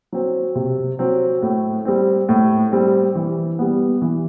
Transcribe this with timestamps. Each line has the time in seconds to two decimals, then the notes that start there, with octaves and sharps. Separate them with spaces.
0.12 F#3 C4
0.55 C3
0.99 F#3 C4
1.42 A2
1.85 G3 C4
2.29 A2
2.72 G3 C4
3.15 E3
3.59 G3 B3
4.02 E3